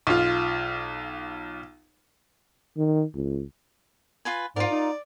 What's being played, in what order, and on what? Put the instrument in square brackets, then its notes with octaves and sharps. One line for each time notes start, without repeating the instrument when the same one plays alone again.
[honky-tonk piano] B1 F4
[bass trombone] D#3
C#2
[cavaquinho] F4 B4 G#5
[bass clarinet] G#2 [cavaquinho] F4 A#4 [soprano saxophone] D5
[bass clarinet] D#4